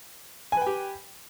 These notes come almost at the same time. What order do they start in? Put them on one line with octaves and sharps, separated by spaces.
G#5 B4 G5 G4